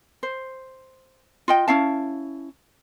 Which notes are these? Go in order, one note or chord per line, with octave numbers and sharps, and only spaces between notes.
C5
F4 D#5 G5
C#4 E4 F5 A5